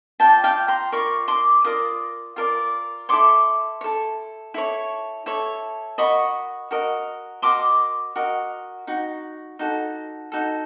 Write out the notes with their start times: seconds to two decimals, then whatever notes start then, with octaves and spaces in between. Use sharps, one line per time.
0.20 F4 A#4 D5 G5 A5
0.44 F5 G5
0.68 A#5 C6
0.92 F4 A#4 D5 B5 C#6
1.28 C6 D6
1.64 F4 A#4 D5 D#6
2.36 F4 A#4 D5
3.09 E4 A4 C#5 C6 D6
3.81 C#5
3.84 E4 A4
4.54 E4 A4 C#5
5.26 E4 A4 C#5
5.98 F#4 A#4 D#5 B5 C#6
6.71 F#4 A#4 D#5
7.42 F#4 A#4 D#5 C6 D6
8.16 F#4 A#4 D#5
8.87 D#4 F#4
9.59 D#4 F#4 A4
10.32 D#4 F#4 A4